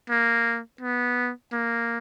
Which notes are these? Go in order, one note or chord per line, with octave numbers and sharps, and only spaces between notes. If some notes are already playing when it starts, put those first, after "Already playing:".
A#3
B3
A#3